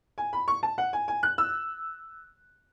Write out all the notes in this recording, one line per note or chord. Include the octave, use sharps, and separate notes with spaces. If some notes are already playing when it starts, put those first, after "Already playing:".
G#5
B5
C#6
A5
F#5
G#5
G#5
F#6
E6